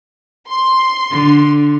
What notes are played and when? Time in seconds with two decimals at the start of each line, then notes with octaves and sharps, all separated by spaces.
0.49 C6
1.10 D3